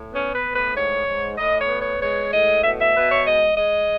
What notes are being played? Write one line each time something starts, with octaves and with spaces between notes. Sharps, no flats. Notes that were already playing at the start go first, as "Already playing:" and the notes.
Already playing: A2
B3 C#4
B4
A2
B4
G#2 C#5
G#2
A2 D#5
C#5
B3
C#5
G#3 C#5
A2 D#5
B2 E5
E5
B2 B4
C#5
G#3 D#5
G#3 D#5